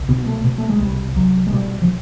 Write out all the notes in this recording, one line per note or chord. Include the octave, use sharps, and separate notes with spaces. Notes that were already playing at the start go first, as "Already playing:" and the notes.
Already playing: C2
B2 B3
A3
B2
A3
G#3
C2 G3
C2 F#3
G#3
B2 G3
F3